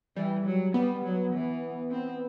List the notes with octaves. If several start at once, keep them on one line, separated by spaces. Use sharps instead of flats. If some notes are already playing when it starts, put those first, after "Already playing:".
E3 G3
F#3
G3 B3
F#3
E3
C4